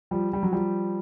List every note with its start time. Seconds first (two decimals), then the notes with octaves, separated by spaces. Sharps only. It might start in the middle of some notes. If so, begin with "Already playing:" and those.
0.11 F3 G3
0.33 G3
0.43 F#3
0.51 F3 G3